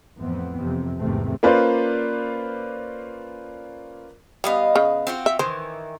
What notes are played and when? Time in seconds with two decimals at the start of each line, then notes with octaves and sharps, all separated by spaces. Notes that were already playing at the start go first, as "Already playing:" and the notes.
0.19 F2 A2 E3 B3 C4
0.61 F2 C3
0.98 G#1 E2 G#2 C3 A3 C4
1.43 A#3 C#4 F4 B4 C5 D5
4.44 G3 B3 D#5 F5
4.76 C#3
5.07 C4 F4 F#4
5.26 E5
5.39 D#3 E3 C5